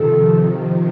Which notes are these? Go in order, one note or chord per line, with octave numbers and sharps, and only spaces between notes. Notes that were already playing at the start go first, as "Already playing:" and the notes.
Already playing: C3 D#3 F3 A4